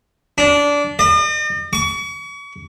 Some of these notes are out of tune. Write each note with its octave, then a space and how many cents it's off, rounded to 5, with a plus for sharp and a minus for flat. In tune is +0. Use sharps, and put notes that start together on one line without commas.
D4 -20
D#5 -45
C#6 +35